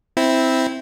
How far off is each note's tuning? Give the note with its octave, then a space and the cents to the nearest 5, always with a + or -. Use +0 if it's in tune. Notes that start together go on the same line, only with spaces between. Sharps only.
C4 +0 E4 -10